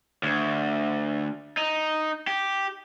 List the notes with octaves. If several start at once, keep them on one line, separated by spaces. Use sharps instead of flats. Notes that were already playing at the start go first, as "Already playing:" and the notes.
D2
D#4
G4